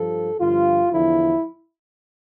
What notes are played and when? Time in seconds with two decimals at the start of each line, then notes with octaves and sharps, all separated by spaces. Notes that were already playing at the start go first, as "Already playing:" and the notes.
Already playing: G2 F3 A4
0.40 G2 D3 F3 F4
0.92 E2 D3 F3 E4